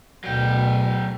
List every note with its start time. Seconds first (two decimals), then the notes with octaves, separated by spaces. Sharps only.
0.24 D2 B2 F#3 G5